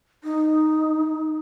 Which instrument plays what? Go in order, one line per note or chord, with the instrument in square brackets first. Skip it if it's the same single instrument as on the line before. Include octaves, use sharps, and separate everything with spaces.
[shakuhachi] D#4